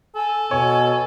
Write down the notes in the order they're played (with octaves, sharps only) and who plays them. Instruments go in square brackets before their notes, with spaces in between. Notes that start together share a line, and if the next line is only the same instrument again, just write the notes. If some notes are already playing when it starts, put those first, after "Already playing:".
[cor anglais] A4 [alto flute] G#5
[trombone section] B2 [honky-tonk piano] C#5 [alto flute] G#5